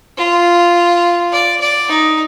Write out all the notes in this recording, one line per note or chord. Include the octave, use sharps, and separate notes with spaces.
F4
D5
D5
D#4